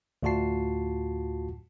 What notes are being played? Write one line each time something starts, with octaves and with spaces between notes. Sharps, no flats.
D2 A2 F4 F#4 A5 C7